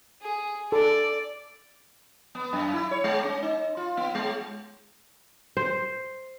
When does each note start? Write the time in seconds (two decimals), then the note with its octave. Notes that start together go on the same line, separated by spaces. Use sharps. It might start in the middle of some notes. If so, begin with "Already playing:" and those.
0.22 G#4
0.72 A4 D5
2.35 B3
2.53 F#2
2.73 E4
2.91 C#5
3.04 G#3
3.24 C#4
3.43 D#4
3.77 F4
3.97 B3
4.15 G#3
5.57 C5